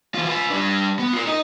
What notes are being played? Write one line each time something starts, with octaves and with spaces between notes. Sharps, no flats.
E3 F4
F4 B4
G3 D4
B3
F4 A#4
D#4 D#5